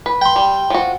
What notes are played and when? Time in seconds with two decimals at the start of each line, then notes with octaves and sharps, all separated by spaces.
0.06 B4
0.21 G5 C6
0.36 G3
0.70 F3 F#4